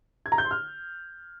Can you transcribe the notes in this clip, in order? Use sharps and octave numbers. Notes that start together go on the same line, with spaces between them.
G#6
A#5
G6
C6
F6